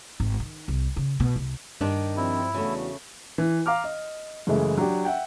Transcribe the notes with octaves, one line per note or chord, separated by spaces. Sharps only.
G#1
D#3
C2
C#3
B2
C2
G2 D#3 D4
F3 G3 C4 E4
E2 C#3 A3 D4 F#4
E3
F5 A#5 D6 F6
D#5
F#2 C#3 E3 G#3 A3 E4
F#3 D4 G4
E5 F#5 G5